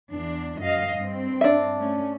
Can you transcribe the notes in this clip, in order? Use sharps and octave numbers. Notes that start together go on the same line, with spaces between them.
E2 D4
F#2 D#5 F5
G2 C4
D4 E5
A3 C#4